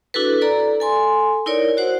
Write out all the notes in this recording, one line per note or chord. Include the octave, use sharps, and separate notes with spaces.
D4 E4 F#4 A4 B4
A4 D5 A#5
A4 G#5 C6
D#4 E4 A#4 C#5 D5
F#4 C5 F#5